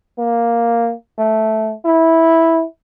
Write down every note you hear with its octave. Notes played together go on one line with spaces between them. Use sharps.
A#3
A3
E4